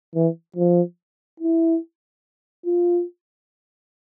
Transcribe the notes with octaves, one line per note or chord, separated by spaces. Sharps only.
E3
F3
E4
F4